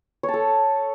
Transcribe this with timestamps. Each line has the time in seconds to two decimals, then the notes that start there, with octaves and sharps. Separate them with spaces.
0.23 C#5
0.29 A5
0.34 A4